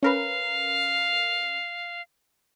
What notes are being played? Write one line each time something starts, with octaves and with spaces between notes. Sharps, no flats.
C#4 A#4 B4 F5